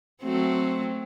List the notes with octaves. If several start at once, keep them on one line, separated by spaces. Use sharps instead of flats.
F#3 A3 C4